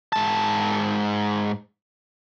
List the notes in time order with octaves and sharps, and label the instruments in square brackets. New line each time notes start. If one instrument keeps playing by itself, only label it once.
[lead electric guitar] G#2 A5